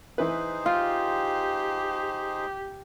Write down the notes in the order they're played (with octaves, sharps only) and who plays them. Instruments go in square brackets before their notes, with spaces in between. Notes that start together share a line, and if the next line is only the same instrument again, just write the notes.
[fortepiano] E3 B4 [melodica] D#4 G#4 C5
[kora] F4 [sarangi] G4